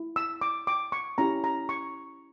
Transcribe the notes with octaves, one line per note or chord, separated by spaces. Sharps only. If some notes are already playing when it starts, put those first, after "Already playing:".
Already playing: E4
E6
D6
D6
C#6
C#4 E4 G4 A#5
A#5
C#6